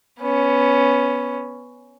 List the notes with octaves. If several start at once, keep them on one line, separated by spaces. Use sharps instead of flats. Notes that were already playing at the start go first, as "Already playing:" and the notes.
B3 C#4